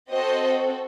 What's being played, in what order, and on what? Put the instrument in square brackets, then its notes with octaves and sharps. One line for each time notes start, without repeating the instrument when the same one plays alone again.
[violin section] C4 F#4 A4 C5 D#5